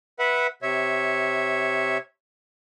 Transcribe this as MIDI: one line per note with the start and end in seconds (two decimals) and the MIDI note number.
0.19 0.47 71
0.19 0.47 76
0.19 0.47 78
0.62 1.98 48
0.62 1.98 73
0.62 1.98 76